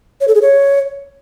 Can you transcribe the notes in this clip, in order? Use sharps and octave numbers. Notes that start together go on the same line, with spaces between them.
C#5
A4
G#4
C#5